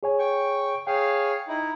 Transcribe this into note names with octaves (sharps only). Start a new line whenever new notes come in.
G#4 C#5 G#5
G5 C#6
G#4 C#5 F5 G5
D#4 E4